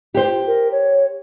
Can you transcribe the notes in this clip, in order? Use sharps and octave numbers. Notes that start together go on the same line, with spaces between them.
F4 G4 C5
A#4
C#5